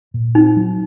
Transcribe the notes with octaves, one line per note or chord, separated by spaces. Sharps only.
A#2
C4 D#4
F#3